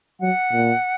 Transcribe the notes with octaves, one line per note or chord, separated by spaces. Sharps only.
F#3 F#5
A#2